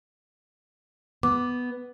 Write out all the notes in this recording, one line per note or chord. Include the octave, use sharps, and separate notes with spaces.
B3 D6